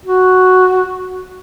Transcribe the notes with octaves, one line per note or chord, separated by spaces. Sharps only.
F#4